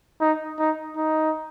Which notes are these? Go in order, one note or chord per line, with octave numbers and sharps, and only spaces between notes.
D#4
D#4
D#4